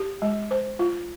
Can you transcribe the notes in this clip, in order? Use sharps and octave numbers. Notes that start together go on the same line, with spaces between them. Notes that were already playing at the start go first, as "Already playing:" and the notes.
Already playing: G4
G#3
C5
F4